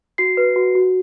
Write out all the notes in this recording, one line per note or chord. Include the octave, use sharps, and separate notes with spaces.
F#4 C7
B4
F#4
F#4